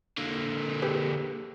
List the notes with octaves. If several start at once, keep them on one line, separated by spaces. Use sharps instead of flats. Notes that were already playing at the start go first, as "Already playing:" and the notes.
D3 A#3
G4 G#4 B4